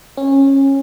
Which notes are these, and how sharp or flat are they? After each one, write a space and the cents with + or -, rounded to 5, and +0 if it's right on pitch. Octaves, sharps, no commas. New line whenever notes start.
C#4 -20